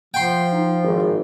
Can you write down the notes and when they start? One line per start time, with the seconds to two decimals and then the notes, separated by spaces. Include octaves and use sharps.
0.14 F3 F#5 G5 C6
0.52 D#4
0.83 G#1